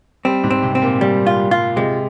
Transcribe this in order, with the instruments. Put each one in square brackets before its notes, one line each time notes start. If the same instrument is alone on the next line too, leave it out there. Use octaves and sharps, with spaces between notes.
[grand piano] G3 [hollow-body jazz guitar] C4
[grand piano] G#2
[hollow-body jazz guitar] C4
[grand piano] C3
[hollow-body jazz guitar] C4
[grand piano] A#2
[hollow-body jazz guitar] G3
F4
F4
[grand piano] C3 [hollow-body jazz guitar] G#3